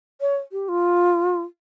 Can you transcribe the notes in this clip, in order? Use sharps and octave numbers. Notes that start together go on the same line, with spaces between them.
C#5
G4
F4